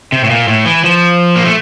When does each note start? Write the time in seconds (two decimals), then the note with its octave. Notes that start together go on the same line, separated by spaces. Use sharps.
0.12 C3
0.24 A2
0.30 A#2
0.48 A2
0.66 E3
0.84 F3
1.36 A#3
1.45 A3